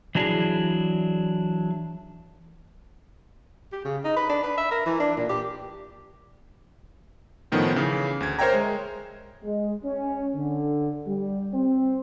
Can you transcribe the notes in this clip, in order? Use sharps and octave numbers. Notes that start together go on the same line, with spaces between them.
E3 F#3 D4 E4 G#4
G4
C#3
D#4
B4
D4
B4
E5
A#4
E3
D4
A#2
G4
A2 D#3 F3 A3 B3 C#4
C#3 E3
D2 G#6
A#4 C5 C#5 E5 G5 A#5
G#3
G#3
C#4
D3
G3
C4